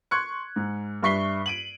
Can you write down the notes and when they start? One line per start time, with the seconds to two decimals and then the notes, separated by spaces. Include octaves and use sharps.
0.11 C6 C#6 F#6 G#6 C#7
0.56 G#2
1.03 G2 E5 C#6 B6 C7 G7
1.46 D7 D#7 F#7